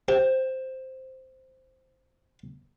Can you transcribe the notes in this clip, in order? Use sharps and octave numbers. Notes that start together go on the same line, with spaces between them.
G4 C5